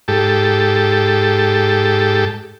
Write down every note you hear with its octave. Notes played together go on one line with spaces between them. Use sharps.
G#2 G4 A4